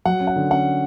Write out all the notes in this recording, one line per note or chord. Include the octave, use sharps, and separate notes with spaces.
F#3 F#5
C#4
F#5
D3
C#4 F#5